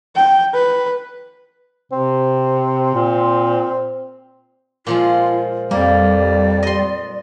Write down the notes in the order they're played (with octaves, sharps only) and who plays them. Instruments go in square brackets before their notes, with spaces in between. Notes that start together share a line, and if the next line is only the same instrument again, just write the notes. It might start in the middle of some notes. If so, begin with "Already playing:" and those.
[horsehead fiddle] G5
B4
[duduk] C3 [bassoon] C4
[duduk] A#2
[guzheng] A#2 F3 G#3 [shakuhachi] F4
[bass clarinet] F2 [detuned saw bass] G3 [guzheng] A#3 [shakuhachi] D5
[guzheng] D#5 C6